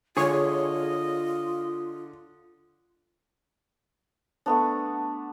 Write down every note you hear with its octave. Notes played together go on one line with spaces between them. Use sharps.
D3 F4 G#4 C#5 D#5
A3 B3 D4